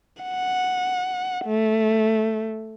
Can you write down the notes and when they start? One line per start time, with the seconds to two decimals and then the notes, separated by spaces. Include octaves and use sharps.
0.23 F#5
1.45 A3